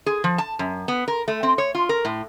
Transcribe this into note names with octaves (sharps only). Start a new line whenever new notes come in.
G#4
F3
A5
F#2
B3
A#4
A3
C4
C#5
F4
A#4
A2